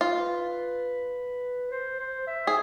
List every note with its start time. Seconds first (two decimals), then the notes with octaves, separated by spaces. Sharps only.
0.01 F4 B4
1.71 C5
1.99 C5
2.27 E5
2.47 G#4